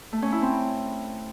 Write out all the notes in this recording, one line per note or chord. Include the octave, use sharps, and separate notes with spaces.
A3
C#4
E4
C4